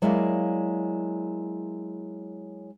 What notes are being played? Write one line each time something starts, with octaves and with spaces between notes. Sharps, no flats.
F#3 G#3 A#3 E4 D5 F5